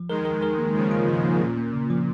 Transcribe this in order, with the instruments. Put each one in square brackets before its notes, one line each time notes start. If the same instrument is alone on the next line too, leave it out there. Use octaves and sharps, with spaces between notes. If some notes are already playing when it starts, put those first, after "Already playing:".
Already playing: [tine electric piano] F3
[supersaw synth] D#3 G#3 [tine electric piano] A#4
[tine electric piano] A#4
A#4
A#3
[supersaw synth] C#3 F3 [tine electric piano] A#4
[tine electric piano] F4
[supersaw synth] G#2 [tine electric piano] D#3
[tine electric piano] A#3
[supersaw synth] A#2 [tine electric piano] C#4
[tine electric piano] A#3
C#3
F3